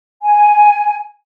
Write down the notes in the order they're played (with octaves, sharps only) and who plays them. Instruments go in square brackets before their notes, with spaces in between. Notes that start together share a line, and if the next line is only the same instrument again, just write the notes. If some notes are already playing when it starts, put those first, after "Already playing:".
[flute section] G#5